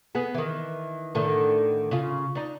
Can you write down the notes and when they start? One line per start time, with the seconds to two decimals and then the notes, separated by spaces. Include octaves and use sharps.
0.15 B3 G#4
0.34 D#3 E3
1.15 A2 D3 D#3
1.91 C#3 F4
2.35 D4 D#4